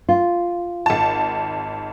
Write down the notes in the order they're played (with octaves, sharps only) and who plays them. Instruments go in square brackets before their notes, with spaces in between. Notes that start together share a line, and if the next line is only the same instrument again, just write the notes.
[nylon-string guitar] F4
[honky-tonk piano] G#1 A5